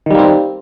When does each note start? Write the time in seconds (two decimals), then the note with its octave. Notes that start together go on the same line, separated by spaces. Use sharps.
0.06 D#3
0.10 G3
0.15 A#3
0.19 C4